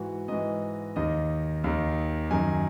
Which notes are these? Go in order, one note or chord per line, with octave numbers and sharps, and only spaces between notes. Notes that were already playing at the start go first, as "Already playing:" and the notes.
Already playing: G#2 E3 F#4
G#2 E3 D#5
D#2 D#3 D#5
D#2 D#3
F#2 D#3 G#5